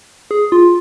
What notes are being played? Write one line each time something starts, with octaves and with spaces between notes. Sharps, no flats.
G#4
F4